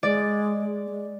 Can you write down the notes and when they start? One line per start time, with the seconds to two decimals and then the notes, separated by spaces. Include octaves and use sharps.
0.03 G#3 D5
0.86 A3
0.90 G#3